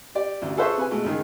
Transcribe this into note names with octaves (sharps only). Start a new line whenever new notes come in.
G4 D5
A1 D2
G#4 A4 B4 C5 E5 C#6
C3 B4 G#5
B2 G#3 A3
C#2 D#3 G#4